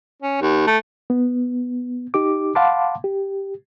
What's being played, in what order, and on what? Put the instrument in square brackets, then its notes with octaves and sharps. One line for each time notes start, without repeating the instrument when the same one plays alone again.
[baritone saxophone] C#4
D#2
A3
[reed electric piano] B3
D#4 G4 D6
F5 F#5 A5 B5 C6 D6
G4